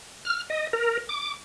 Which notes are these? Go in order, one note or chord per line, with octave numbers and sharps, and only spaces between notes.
F6
D#5
A#4
D6